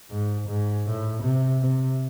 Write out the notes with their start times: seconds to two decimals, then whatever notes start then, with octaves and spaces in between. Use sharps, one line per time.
0.11 G#2
0.48 G#2
0.87 A2
1.23 C3
1.62 C3